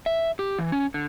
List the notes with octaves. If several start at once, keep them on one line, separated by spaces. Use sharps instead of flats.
E5
G4
E3
C#4
D3